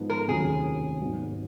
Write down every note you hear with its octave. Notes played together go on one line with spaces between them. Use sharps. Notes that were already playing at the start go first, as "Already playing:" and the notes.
Already playing: G#2 F3 G#3 B3 D#4
A#4
F1 D#2 C#3 F#3 G#4
G#1 G#2 F#3 B3